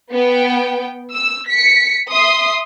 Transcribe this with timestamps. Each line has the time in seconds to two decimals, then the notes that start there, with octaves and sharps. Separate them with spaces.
0.12 B3 G5
1.13 E6
1.49 B6 C#7
2.11 E5 C6 D#6